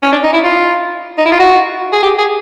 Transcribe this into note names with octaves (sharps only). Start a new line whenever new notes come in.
C#4
D4
D#4
E4
F4
D#4
E4
F4
F#4
G#4
G4
G#4